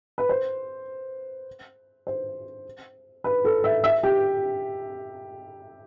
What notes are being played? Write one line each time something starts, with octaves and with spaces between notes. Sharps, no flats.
B4
C5
C5
B4
A4
E5
E5
G4